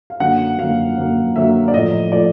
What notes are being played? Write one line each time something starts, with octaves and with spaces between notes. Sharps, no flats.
F5
F#2 D3 F#3 A#3 F#5
F#2 D3 F#3 A#3 F5
F#2 D3 F#3 A#3
F#2 D3 F#3 A#3 E5
D5
A2 F3 A3 D#5
A2 F3 A3 D5